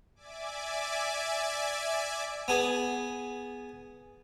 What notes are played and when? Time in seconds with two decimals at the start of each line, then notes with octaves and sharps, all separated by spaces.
0.15 D5 E5 G#5 D6
2.48 B3 G#4